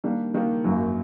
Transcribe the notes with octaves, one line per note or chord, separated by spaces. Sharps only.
D#3 G3 A#3 D4
D#3 G3 A#3 D4
G#1 F#2 D#3 F#3 A#3